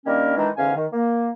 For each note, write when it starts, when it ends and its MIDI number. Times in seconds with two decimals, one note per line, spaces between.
0.06 0.34 51
0.06 0.34 55
0.06 0.34 58
0.06 0.34 61
0.06 0.34 62
0.06 0.34 70
0.37 0.49 51
0.37 0.49 52
0.37 0.49 56
0.37 0.49 62
0.37 0.49 63
0.57 0.73 40
0.57 0.73 44
0.57 0.73 50
0.57 0.73 61
0.57 0.73 77
0.57 0.73 80
0.76 0.86 51
0.93 1.29 58